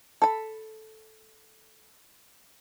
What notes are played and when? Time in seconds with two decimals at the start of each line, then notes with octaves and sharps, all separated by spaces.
0.22 A4 B5